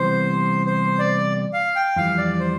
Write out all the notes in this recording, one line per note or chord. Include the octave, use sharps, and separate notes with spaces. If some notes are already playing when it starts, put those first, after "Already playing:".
Already playing: C3 E3 G3 B3 C5
C5
D5
F5
G5
F2 E3 G3 F5
D5
C5